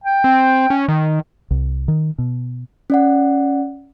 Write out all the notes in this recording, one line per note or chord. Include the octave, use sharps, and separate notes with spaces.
G5
C4
C#4
D#3
C2
D#3
B2
C#4 D5 F#5